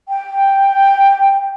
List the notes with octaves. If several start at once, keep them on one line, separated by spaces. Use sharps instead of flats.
G5